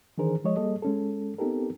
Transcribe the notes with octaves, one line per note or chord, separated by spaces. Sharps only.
D#3 E3 D4 G#4 A#4 C5
F3 G#3 C#5 D#5
G3 A#3 G#4 A4 D#5
G#3 C#4 A4
B3 C4 D#4 G4 A4 A#4